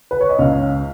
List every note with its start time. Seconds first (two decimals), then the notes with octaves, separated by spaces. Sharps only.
0.11 B4
0.21 C#5
0.29 D#5
0.39 C#2 F5